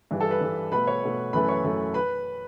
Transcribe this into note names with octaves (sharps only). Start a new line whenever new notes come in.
G2 E3 G3
A4 A5
B4 B5
G2 E3 G3
B2 A3 B4 B5
C#5 C#6
B2 A3
F#2 E3 A3 B4 B5
C#5 C#6
F#2 E3 A3
B4 B5